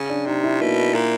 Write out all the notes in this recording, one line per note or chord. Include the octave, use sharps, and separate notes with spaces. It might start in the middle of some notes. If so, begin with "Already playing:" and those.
Already playing: C#3
D4
C3 D#4
E4
B2 A#3
A#2